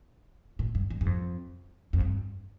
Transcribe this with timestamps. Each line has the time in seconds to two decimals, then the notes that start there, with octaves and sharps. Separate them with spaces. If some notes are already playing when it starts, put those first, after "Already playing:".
0.59 A2
0.75 G2
0.90 G2
1.01 G2
1.06 F2
1.93 F2
2.01 G2